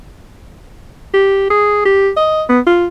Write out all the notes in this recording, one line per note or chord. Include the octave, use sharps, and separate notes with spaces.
G4
G#4
G4
D#5
B3
F4